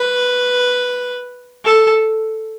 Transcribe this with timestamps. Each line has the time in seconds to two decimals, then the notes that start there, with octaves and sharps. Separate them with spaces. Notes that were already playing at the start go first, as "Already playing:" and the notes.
Already playing: B4
1.65 A4